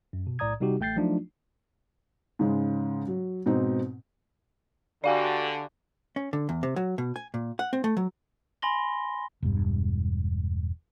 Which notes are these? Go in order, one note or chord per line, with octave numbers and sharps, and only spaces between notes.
F#2
B2
B1 A2 D5 A#5 D#6 G#6
C3 G3 D#4 F#4 G4
A1 A3 G5 G6 A6 C7
F3 F#3 A3 D4 D#4 F4
G#2 C#3 G#3
F#3
G#2 B2 C4 D#4
D3 F#4 G4 D5 F5 G#5
C#4
D3
E2
C3
F#3
B2
G#5
A#2
F#5
C4
A3
F#3
G#5 B5 C6 A#6 G7
E1 G2